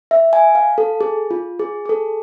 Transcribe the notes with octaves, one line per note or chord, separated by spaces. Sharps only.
E5
G#5
F5
A4
G#4
F4
G#4
G#4
A4